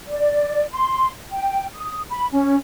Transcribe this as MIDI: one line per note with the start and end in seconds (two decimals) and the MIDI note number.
0.08 0.65 74
0.72 1.10 84
1.31 1.67 79
1.74 2.01 87
2.11 2.27 83
2.32 2.57 61